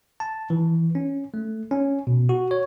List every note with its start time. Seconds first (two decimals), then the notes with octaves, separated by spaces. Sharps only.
0.20 A5
0.50 E3
0.95 C#4
1.34 A3
1.71 C#4
2.07 B2
2.29 F#4
2.51 C#5